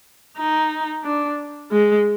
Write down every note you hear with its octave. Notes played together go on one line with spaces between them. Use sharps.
D#4
D4
G#3